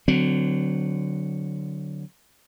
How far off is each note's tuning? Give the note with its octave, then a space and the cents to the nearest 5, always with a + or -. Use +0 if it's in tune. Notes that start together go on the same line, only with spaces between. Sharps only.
D3 +0 F#3 +0 C4 -35